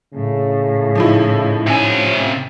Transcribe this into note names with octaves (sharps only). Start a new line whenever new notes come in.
A2 C#3
F3 D#4 E4
C3 C#4 G#5